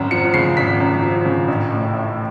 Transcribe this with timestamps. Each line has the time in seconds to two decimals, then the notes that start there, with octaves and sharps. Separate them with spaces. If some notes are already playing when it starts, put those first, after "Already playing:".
Already playing: G#1 F#2
0.11 F3 C#7
0.34 C#3 C7
0.57 G#1 B6
0.80 F#2
1.02 F3
1.25 C#3
1.48 A1
1.71 A2
1.94 A3